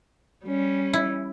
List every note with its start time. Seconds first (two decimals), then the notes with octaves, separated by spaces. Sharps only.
0.45 G3 C#4
0.93 E4